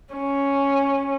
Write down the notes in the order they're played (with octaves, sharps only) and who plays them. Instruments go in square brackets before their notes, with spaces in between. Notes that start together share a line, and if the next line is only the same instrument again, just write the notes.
[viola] C#4